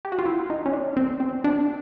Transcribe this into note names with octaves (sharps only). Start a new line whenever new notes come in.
G4
F#4
F4
E4
D#4
C#4
D4
C4
C4
D4